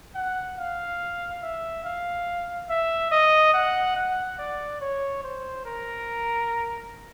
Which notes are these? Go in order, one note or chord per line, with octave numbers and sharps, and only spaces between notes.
F#5
F5
E5
F5
E5
D#5
F#5
F#5
D5
C#5
C5
A#4